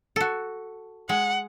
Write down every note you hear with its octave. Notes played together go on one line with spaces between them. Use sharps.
F#4 A4
G#3 F#5